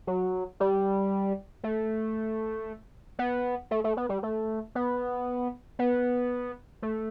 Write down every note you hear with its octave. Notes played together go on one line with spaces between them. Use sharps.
F#3
G3
A3
B3
A3
A3
B3
G3
A3
B3
B3
A3